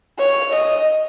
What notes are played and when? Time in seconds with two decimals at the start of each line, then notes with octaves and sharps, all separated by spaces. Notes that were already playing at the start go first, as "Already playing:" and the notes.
0.19 C#5
0.52 D#5